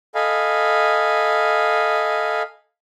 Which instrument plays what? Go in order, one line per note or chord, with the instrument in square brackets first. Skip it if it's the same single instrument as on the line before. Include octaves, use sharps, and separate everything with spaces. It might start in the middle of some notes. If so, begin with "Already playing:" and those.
[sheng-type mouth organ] A4 D#5 F5 G#5 B5